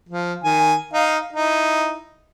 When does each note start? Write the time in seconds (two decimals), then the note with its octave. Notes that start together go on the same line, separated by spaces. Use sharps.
0.09 F3
0.44 D#3 G#5
0.93 D#4 F5
1.33 D#4 E4